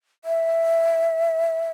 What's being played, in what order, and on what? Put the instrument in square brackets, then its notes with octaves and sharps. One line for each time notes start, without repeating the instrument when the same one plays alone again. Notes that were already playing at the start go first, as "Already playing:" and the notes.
[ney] E5